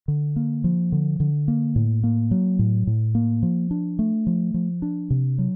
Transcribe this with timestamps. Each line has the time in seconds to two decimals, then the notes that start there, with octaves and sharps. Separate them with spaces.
0.08 D3
0.36 A#3
0.64 F3
0.92 D3
1.20 D3
1.48 A#3
1.76 A2
2.04 A#3
2.31 F#3
2.59 A2
2.87 A2
3.15 A#3
3.43 F3
3.71 D4
3.99 A3
4.27 F3
4.54 F3
4.82 D4
5.10 C3
5.38 F#3